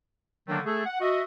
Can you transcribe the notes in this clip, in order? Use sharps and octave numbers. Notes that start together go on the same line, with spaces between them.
D3 D#3 F#3 A3 A#3 D4
A3 G#4 A4
F#5
F#4 D#5 E5